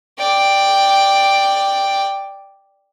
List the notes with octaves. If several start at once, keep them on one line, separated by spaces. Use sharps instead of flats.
D5 G5